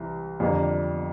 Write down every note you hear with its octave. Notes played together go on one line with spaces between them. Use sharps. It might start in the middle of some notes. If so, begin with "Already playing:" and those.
Already playing: C2 E3
F2 D3 G3 A#3 D4